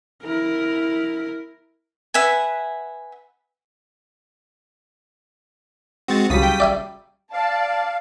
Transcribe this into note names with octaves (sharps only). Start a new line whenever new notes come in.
E4 A#4
B4 E5 F#5 G#5
G#3 C4 F#4 A6
C#2 C#3 F#3 G3 D#6 B6
G5
D5 E5 G#5
D5 F5 A5